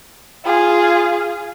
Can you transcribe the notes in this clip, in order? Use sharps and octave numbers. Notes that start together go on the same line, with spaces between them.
F4 G#4